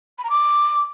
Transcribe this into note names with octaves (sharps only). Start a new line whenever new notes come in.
B5
A#5
D6